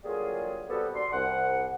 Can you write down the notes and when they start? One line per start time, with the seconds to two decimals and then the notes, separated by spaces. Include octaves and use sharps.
0.04 D3 F#3 G3 A#3 F4 G#4
0.69 C3 G3 B3 F#4 G4 A4
0.95 D4 C6
1.12 C2 F#5